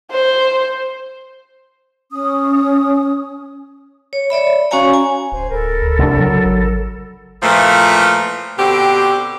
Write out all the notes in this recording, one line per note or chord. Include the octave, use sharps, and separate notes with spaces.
C5
C#4 D#6
C#5
C#5 D5 E5 B5
C#4 F#4 C#5 F5 G#5 A#5
G#5
D1 C5 G#5
D1 A4 A#4 B5
D2
C2 G#3 D4
C#3 F#3
G#1
A#2 E3 F3 A3
B2 D3 C4 G4